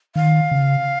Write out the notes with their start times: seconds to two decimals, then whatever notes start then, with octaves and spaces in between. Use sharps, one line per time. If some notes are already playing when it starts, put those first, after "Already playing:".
0.16 D#3 F5
0.51 C#3